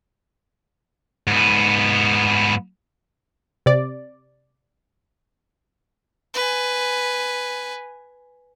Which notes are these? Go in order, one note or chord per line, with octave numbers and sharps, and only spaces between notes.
G#2 B3
C3 D5
B4 G#5